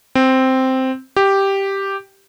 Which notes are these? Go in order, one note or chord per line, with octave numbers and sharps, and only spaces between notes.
C4
G4